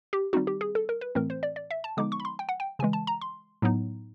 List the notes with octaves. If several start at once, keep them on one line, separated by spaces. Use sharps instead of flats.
G4
D#3 G3 C4 D#4 F#4
G4
G#4
A4
A#4
B4
A2 E3 A3 C4 A#4
C5
D5
D5
E5
A5
D3 F3 G#3 B3 D#4 D6
C#6
B5
C6
G5
F#5
G5
C#3 E3 G#3 G#5
A5
A#5
C6
A2 F#3 B3 D#4